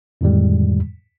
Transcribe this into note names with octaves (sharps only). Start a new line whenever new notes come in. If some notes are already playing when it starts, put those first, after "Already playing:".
F2 A2 D3 D#3 G3 G#3